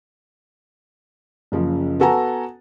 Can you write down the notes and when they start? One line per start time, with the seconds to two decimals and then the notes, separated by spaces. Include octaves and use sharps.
1.52 F#1 C#3 F3
2.00 B3 F#4 A4 F#5 G#5 A#5